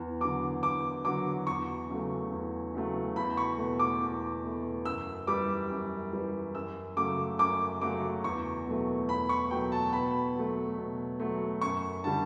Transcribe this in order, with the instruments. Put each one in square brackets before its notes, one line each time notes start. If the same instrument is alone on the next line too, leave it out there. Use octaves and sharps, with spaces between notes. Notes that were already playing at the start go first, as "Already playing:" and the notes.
Already playing: [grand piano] E2
D3 F#3 D6
E2 D6
D3 F#3 D6
E2 C#6
C#3 F#3 A3
E2
C#3 F#3 A3
E2 B5
C#6
B2 A3
D6
E2
B2 A3
F#2 E6
E3 G3 D6
F#2
E3 G3
F#2 E6
C#3 F#3 A3 D6
F#2 D6
C#3 F#3 A3 D6
E2 C#6
B2 F#3 A3
E2 B5
C#6
B2 F#3 A3 G5
A5
B2 B5
F#3 A3
B2
F#3 A3
F#2 C#6
D3 G3 A5